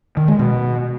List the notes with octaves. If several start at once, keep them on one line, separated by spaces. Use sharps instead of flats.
D#3
G#3
B2